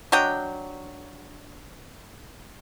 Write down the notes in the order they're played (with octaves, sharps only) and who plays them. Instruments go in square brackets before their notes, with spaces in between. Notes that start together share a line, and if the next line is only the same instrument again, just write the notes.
[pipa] F#3 D4 D#5 G5